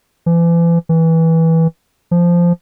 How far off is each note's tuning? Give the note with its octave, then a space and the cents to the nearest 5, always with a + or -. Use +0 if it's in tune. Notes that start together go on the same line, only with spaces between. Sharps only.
E3 +40
E3 -15
F3 -10